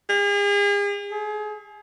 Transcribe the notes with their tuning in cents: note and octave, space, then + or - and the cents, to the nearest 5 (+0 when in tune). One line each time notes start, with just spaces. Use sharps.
G#4 -40
G#4 +30